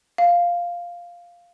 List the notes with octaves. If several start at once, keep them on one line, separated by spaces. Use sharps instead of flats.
F5